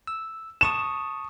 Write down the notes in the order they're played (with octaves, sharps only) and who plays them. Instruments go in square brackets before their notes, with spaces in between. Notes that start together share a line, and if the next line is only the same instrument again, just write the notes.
[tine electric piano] E6
[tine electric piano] A5 C#6 D#6 [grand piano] E7